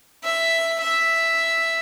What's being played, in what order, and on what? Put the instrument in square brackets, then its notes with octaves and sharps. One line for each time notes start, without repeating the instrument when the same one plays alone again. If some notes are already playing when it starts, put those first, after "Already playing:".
[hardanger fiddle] E5
E5